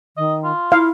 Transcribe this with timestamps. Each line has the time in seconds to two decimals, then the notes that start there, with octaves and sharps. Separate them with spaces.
0.17 D#3 D#5
0.44 F4
0.72 E4 F5